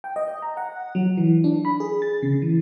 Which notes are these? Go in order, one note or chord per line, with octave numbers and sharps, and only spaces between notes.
G5
D#5
A#5
F#5
F#3
E3
D4
B5
G#4
A6
C#3
E3